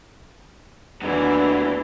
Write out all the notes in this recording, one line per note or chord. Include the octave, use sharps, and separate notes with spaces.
D#2 D3 E3 F#3 A3 B3 D4